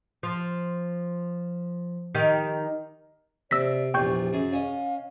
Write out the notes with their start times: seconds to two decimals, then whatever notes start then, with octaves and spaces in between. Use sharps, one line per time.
0.23 F3
2.15 D#3 D#4 G4
3.51 C3 D5 E6 A#6 B6
3.94 A#1 E2 A#2 G4 G5 C#6 G6
4.33 F#2 G#4
4.53 C#4 D#5 F5